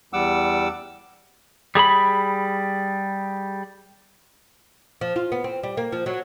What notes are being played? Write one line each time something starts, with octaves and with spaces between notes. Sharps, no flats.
E2 G3 F#5 D6 E6
G3 G#4 A#5 B5
F3
F4
B3
C4
G3
A#3
F3
F#3